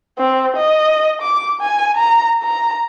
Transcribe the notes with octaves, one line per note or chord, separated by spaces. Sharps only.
C4
D#5
D6
G#5
A#5
A#5